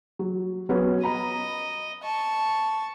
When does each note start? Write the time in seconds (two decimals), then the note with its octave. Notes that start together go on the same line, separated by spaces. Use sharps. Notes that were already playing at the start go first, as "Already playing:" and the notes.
0.19 F#3
0.69 F#3 B3 C#4
1.03 D#5 A#5 B5
2.03 A5 C#6